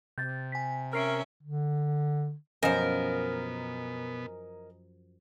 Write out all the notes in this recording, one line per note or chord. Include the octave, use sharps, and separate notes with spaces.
C3 G6 A6
G#5 B6
C#4 A#4 E5 F6 C7 D7
D3
F#2 B2 F3 B3 A#4 D#5 G#5 A#5